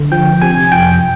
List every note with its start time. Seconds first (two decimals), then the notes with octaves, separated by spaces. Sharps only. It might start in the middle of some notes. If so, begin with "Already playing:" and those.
Already playing: D3
0.12 F3 G5
0.42 C3 G#5
0.72 F2 G5